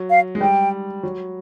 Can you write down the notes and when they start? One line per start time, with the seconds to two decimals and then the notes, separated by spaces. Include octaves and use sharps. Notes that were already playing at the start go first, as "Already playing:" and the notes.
Already playing: F#3
0.10 F5
0.35 G#3
0.41 G3 G5
1.03 F#3